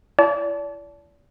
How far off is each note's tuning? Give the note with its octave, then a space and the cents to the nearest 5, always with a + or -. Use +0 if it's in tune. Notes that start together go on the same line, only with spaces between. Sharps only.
E4 +35 D5 -35 A5 -15